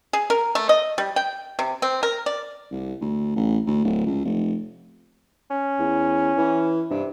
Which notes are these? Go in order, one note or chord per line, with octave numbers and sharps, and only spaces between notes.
G#4
A#4
A3
D#5
G3
G5
C3
C4
A#4
D5
C2
D2
A1
D2
D1
C#2
F1
C#4
E2
E3
G2 C3